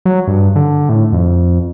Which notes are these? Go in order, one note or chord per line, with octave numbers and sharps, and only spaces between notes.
F#3
G2
D3
A2
F2